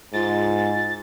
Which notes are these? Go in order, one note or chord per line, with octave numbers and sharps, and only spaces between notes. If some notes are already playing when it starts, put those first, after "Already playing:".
G#2 F4 A6